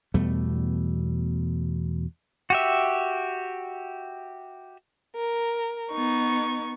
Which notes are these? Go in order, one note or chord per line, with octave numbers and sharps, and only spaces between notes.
E2 B2 G3 A3
F#4 G4 E5
A#4
B3 D#4 C#6